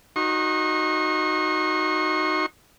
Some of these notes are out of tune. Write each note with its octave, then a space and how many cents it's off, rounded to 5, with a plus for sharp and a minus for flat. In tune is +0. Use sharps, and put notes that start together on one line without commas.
D#4 +0 F#4 +0 C#6 -45